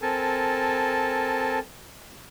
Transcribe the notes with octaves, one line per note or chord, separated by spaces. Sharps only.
C4 A4 A#4 G#5 A5